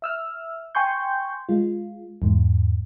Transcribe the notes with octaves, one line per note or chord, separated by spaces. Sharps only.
E5 E6 F6
G5 G#5 C6 C#6 G6
G#3 F4
E2 G#2